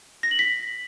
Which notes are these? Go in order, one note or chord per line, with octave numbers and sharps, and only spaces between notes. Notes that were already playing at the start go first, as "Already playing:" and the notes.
A#6
F#7
B6